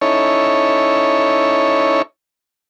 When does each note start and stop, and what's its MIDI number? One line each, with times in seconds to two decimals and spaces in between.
0.01 2.02 61
0.01 2.02 63
0.01 2.02 64
0.01 2.02 69
0.01 2.02 73